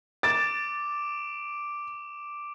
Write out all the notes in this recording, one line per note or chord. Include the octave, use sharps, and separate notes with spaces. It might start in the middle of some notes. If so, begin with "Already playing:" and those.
D6 A6 D7 E7